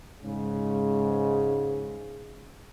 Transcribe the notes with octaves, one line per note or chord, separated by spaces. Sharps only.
G#2 C#3